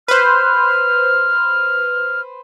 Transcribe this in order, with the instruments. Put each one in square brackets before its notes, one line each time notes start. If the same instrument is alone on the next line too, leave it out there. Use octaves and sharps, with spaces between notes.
[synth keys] B4 C5 [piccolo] F6